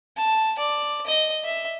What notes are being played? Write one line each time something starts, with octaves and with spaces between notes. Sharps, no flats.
A5
D5
D#5
E5